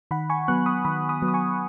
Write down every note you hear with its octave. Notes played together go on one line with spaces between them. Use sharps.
D#3 F#5 B5
G#5 C#6
F#3 B3 C#6 F#6
B5 D#6
D#3 B5 D#6
B5 D#6
F#3 B3
D#6
G#5 C#6